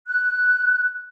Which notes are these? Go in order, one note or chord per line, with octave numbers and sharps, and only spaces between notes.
F#6